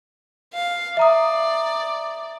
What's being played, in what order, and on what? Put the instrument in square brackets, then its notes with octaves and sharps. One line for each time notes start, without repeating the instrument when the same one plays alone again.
[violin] F5
[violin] D5 [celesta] E5 A#5 D#6